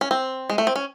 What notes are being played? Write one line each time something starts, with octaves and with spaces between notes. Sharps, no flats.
C#4
C4
G#3
A3
C4
C#4